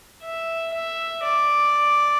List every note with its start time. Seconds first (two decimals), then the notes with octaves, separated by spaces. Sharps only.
0.23 E5
0.74 E5
1.24 D5